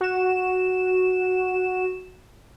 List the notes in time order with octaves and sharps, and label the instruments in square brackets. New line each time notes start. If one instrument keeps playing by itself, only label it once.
[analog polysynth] F#4 E7